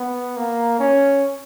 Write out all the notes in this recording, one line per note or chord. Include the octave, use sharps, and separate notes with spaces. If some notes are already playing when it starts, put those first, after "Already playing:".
Already playing: B3
A#3
C#4